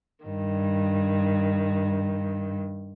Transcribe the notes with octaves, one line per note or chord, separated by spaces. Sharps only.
G2 D#3